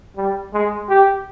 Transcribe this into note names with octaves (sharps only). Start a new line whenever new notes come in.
G3
G#3
G4